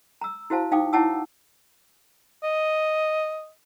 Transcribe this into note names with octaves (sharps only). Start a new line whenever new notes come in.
A#5 E6
E4 F#4 C5 F5 A5
D#4 F5 G5 D6 D#6
E4 C#5 F#5 A5 D6 E6
D#5